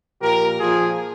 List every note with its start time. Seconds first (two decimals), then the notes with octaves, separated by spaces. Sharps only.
0.21 A#2 F3 G4 A#4
0.60 A#2 F3 F4 G#4